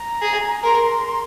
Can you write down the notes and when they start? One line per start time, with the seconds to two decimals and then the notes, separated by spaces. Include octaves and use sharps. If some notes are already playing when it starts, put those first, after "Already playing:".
Already playing: A#5
0.21 G#4
0.63 A#4 C6